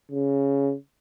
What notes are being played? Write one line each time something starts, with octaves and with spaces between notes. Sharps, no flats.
C#3